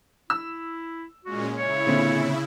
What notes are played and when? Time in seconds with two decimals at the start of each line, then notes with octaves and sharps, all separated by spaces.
0.30 E4 E6
1.25 A#2 G#3 C#4 F#4
1.57 C#3 E4 C#5
1.87 A#2 D3 C4